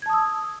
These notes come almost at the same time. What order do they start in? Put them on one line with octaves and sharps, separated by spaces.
G#6 A5 D#6 E6